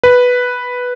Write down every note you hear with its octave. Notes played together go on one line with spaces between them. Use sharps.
B4